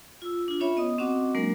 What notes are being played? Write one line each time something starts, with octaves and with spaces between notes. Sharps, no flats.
F4 E6
D4 F4
C#4 F4 C#5 E5 B5
B3 D#5 D#6
C4 C#4 F#4 D#5 F#5 D6
F#3 G#3 A#3 D4 A#4